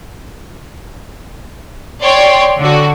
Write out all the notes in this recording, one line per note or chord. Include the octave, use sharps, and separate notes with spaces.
C#5 D5 G5 C6
D3 F#4